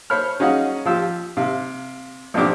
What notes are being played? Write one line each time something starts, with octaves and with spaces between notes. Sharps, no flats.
C5 C#5 B5 F6
C#4 D#4 F#4 G#4 F5 F#5
F3 F4 G4 E6
C3 F5
B1 F3 C4 D4 G4 D6